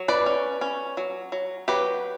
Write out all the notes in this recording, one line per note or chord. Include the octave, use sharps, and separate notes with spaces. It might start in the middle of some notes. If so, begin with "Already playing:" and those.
Already playing: F#3
B4 D5
C#4
C#4
F#3
F#3
F#3 G4 B4